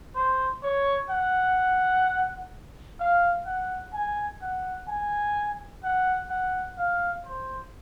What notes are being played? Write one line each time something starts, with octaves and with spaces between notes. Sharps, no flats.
C5
C#5
F#5
F5
F#5
G#5
F#5
G#5
F#5
F#5
F5
C5